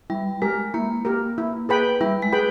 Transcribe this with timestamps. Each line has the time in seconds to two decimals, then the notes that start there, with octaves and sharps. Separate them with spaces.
0.10 G3 E4
0.42 G#3 G4 A#4
0.74 A#3 E4
1.05 G4 A#4
1.38 E4
1.69 G#4 B4 G5 B5
2.01 G3 E4
2.22 G#3
2.32 G#4 B4 G5 B5